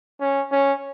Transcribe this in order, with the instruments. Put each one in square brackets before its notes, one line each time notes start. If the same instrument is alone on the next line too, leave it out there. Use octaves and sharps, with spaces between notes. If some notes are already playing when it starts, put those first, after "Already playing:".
[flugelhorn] C#4
C#4